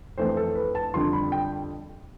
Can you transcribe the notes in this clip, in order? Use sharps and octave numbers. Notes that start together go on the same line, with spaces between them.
F2 E3 A3 C4 C5
A4
B4
A5
F2 D3 G3 D4 F4 C6
B5
G5